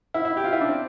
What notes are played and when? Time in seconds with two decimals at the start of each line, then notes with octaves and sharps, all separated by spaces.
0.14 E4
0.25 E4
0.37 G4
0.44 F4
0.53 E4
0.61 D4
0.69 C4